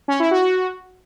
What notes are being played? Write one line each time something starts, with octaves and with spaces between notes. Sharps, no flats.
C#4
E4
F#4